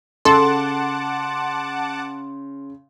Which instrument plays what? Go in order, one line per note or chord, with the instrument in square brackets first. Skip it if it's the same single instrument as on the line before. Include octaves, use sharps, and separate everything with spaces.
[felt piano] C#3 [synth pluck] A4 [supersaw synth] F#5 A5 D6 [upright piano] C6